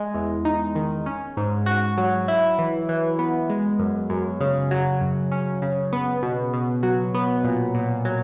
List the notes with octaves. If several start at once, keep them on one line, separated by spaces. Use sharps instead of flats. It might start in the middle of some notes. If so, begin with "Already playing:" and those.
Already playing: G#3
E2
D#4
D#3
C#4
G#2
F#4
F#3
E4
E3
E3
B3
G#3
F#2
F#2
C#3
F#3
F#2
C#4
C#3
B3
B2
B2
F#3
B3
A#2
A#2
F#3